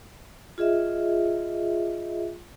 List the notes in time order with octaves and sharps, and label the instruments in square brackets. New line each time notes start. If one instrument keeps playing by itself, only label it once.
[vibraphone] F4 G#4 D#5 E5